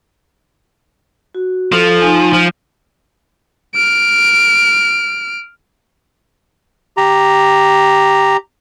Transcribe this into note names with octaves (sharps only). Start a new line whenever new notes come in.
F#4
F3 A4
D#4 G#5
F3
F6 D7
G4 A#5